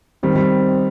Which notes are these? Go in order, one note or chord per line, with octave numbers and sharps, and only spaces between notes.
D#3 G3 C4
G3